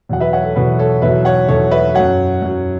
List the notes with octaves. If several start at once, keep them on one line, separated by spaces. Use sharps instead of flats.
E2 B2 F#3 F#5
B4 E5
C#5 F#5
A4
E2 B2 F#3 B4
A4 C#5
E2 B2 F#3 B4 E5
C#5 F#5
E2 B2 F#3 A4 C#5
B4 E5
F#2 F#3 C#5 F#5
F#2 F#3